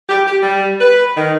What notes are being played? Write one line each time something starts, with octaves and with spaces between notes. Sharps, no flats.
G4
G4
G3
B4
D#3